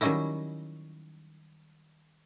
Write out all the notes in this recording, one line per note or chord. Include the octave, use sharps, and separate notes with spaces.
D#3 F#3 G3 C#4 D#4 E4